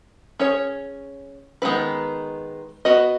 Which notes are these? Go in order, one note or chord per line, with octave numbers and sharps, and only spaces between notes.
C#4 G#4 C#5
D#3 G#3 B3 E4 B4
B3 F#4 B4 D#5